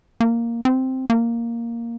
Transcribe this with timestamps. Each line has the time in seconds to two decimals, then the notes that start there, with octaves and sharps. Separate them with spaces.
0.20 A#3
0.65 C4
1.10 A#3